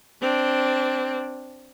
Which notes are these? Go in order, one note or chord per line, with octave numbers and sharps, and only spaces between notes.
C4 D4